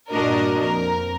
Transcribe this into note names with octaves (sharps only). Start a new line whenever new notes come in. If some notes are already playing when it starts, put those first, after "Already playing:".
G2 A#2 D4 F#4 A#4 D#5
F2 A#4